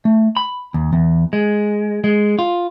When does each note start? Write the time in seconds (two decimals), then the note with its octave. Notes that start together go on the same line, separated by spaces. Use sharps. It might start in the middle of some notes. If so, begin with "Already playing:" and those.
0.05 A3
0.37 B5
0.74 D#2
0.93 E2
1.33 G#3
2.04 G#3
2.39 F4